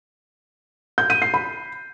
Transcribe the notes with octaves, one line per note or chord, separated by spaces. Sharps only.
G6
D#7
C7
B5